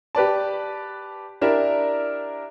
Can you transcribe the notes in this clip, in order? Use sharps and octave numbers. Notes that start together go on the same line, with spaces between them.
G4 B4 D5 A5
D4 E4 G4 A#4 D5 E5